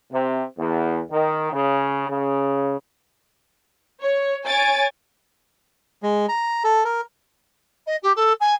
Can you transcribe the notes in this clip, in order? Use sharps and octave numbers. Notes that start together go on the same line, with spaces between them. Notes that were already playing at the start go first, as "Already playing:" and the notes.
C3
E2
D#3
C#3
C#3
C#5
C#5 G#5 A6 D7
G#3
A#5
A4
A#4
D#5
G4
A4
G#5